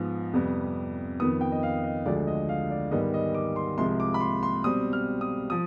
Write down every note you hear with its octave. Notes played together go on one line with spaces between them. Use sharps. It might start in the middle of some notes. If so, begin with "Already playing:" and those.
Already playing: G#2 F3 B3
F2 C3 G3 B3
F2 D#3 B3 D#6
G5
D#5
F5
D#5
D2 D3 F3 G#3 D5
D#5
F5
D5
G#2 D#3 G3 B3 D#5
D#5
D6
C6
C2 C3 F3 G#3 C6
D6
B5
C6
C6
B2 G3 C4 D#6
F6
D#6
F3 D#6